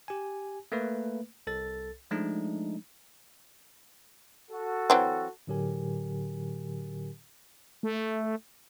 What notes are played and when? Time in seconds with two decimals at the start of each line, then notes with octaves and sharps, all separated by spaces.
0.08 G4 G#5
0.72 A3 A#3 B4
1.47 C2 A4 A6
2.11 F3 G#3 A3 D4 D#4
4.51 F#4 A4
4.90 E3 F#3 C4
5.47 A2 D3 F#3 G4 A#4 G#5
7.83 A3